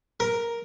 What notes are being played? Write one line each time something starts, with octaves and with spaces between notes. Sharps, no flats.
A#4